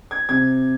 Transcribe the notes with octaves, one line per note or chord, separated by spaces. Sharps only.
G#6
C3 G#6